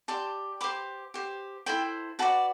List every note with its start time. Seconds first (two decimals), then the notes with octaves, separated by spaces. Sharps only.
0.08 G4 D5 A5 C6
0.61 G4 C5 B5 D6
1.14 G4 C5
1.66 E4 A4 C5 G5 B5
2.19 F#4 B4 D5 F#5 A5